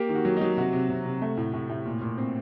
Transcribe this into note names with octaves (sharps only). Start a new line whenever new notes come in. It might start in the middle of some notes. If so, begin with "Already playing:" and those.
Already playing: A#3 G4
D#3
F#4
F#3
F#3 D#4
C3 F#4
C3
C3
C3
A3
A2
A2
A2
A#2
A#2
C4